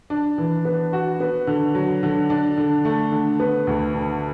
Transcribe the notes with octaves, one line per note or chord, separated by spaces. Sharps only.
D4
E3
B3
F#4
B3
D3
F#3
D3
D4
D3
A3
D3
B3
D2
D3